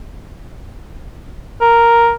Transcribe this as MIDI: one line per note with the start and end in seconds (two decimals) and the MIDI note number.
1.61 2.12 70